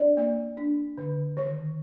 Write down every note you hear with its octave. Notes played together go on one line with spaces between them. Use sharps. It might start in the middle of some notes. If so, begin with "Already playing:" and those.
Already playing: D4 D5
A#3
D4
D3
D#3